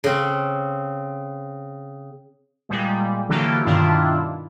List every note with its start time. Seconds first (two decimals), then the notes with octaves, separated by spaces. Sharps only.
0.04 C#3 C4
2.69 A#2 G3 G#3
3.29 D3 E3 F#3 A#3 G4 A4
3.65 G2 B2 D#3 D4 E4 F4